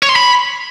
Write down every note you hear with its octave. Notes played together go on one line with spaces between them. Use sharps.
C#5
C6
B5